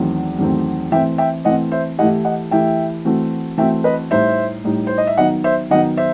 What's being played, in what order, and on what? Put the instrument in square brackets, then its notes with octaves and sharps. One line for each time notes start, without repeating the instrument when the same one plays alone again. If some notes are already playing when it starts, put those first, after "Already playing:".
Already playing: [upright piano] E2 D#3 F#3 A3 C4
E2 D#3 F#3 A3 C4
[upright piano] E3 A3 C4 [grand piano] E5 G5
[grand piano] E5 G5
[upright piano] E3 A3 C4 [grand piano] D#5 F#5
[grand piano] C5 E5
[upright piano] E3 A3 E4 G4 [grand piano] D#5 F#5
[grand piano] D#5 F#5
[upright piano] E3 A3 E4 G4 [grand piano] E5 G5
[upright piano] E3 A3 C4 F#4
[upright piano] E3 A3 C4 F#4 [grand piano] E5 G5
[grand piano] B4 D#5
[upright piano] A2 G3 D#4 [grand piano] C5 E5
[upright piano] A2 G3 D#4
[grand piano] C5
D#5
E5
[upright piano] D#3 F#3 B3 D#4 [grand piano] D#5 F#5
[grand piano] C5 E5
[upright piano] D#3 F#3 B3 D#4 [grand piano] D#5 F#5
[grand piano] C5 E5